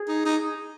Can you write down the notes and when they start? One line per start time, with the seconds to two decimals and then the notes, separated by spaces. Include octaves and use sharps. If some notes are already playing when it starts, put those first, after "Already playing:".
Already playing: G#4
0.08 D#4
0.26 D#4